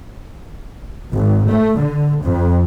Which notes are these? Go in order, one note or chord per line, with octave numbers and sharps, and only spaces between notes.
G#1
A3
D3
F2